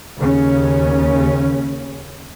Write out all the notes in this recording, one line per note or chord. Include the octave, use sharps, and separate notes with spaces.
D#2 C#3 C#4